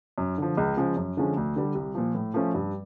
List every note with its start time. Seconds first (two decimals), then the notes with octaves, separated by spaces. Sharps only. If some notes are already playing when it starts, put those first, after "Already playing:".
0.18 F#2
0.38 D3 F3
0.57 C#2
0.77 C#3 F3 G#3
0.96 F#2
1.17 D3 F3 G#3 C#4
1.37 D2
1.56 D3 G3
1.75 C2
1.95 A#2 F3
2.15 A2
2.34 F3 A3 C#4 F4
2.55 G2